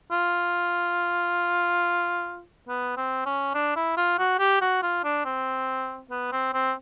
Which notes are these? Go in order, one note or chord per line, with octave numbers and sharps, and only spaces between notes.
F4
B3
C4
C#4
D4
E4
F4
F#4
G4
F#4
F4
D4
C4
B3
C4
C4